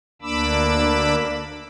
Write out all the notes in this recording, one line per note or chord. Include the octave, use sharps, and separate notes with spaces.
D2 A#3 D4 B5 D6 E6